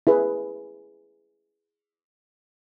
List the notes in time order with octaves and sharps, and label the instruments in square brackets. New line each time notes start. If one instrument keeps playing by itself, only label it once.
[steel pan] E4 G#4 B4